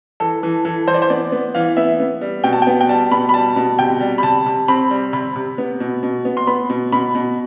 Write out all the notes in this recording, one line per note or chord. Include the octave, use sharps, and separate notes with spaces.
E3 A4
E3
E3 A4
E3 C5
D5
C5
B3 D5
B3
E3 F5
B3 E5
B3
G3
B2 G5
A5
B3 G5
G5
G3 A5
B2 B5
B5
G3 A5
B2
C3 G5
G3
B5
C3 A5
C3
C4 B5
G3
C3 B5
C3
B3
B2
B2
B3
C6
B3 B5
B2
B2 B5
B2